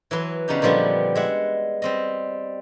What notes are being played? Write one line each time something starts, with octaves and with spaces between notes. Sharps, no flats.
E3 F#3 B4 C6
C#3 B3 D4 D#4 G4
A#2 D3 F3 G3 B3
G#3 E5 F#5
G3 C4 D#5